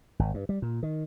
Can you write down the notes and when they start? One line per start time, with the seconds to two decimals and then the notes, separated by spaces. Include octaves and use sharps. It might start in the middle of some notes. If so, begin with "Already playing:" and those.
0.19 G#1
0.34 G2
0.49 G3
0.62 A#2
0.83 D#3